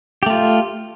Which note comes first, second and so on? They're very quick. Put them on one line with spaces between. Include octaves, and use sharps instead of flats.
G4 A3 F4